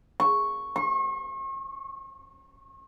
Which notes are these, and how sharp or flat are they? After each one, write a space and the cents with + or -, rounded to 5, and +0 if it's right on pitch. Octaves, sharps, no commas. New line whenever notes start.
C#6 -5
C#6 -45